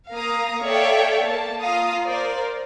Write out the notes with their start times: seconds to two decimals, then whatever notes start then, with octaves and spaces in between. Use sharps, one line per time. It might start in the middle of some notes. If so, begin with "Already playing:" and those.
0.11 A#3 F5 A#5 D#6
0.65 A4 C#5 D5 E5 F5 G5
1.24 A#3 A5
1.61 F4 F5 A#5 D#6
2.04 A#4 C5 D5